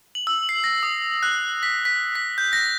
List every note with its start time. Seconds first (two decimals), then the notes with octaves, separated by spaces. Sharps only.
0.15 F#7
0.27 E6
0.49 C7
0.64 A#6
0.83 D#6
1.23 F#6
1.63 B6
1.85 B6
2.15 B6
2.38 G6
2.53 A#6